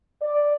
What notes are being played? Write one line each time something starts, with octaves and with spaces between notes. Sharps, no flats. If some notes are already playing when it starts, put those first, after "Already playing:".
D5